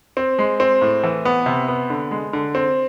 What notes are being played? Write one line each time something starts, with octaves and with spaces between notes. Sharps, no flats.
C4
G#3
C4
A2
E3
B3
C3
B3
D3
G#3
D3
C4